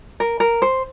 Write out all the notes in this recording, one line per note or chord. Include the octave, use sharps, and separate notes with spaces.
A#4
A#4
C5